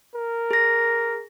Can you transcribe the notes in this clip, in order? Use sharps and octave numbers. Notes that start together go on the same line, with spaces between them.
A#4
G#4 A#6